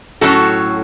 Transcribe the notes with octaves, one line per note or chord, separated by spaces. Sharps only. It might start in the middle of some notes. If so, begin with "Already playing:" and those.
A2 F#3 C#4 F#4 A4